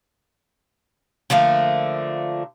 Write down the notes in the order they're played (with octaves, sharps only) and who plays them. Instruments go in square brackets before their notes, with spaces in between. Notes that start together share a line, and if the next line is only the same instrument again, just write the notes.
[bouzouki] D3 F3 A3 A#3